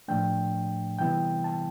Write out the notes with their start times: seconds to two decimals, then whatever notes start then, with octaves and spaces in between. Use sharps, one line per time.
0.08 A2 F3 A3 D4 G5
0.99 C3 E3 G3 B3 E4 G5
1.44 A5